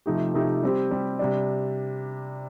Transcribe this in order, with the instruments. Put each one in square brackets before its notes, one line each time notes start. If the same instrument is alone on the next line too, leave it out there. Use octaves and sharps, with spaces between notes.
[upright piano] C3 F3 A3 D#4 G4
C3 F3 A3 D#4 G4
G3 C4 G4
G3 C4 G4
C3 G3 D4